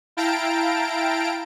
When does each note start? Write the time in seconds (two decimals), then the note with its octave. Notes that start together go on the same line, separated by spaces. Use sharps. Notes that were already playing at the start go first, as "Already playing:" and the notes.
0.17 E4 F5 G5 A5 A#5 D7